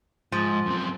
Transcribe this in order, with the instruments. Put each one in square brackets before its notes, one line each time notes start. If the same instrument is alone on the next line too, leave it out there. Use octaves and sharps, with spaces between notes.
[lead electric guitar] G#2 [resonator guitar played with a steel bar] F3
[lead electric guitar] F#2 C4